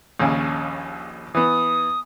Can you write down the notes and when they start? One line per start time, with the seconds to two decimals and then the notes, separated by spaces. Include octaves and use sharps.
0.20 A#1 D#2 C#3
1.35 E3 B3 D#6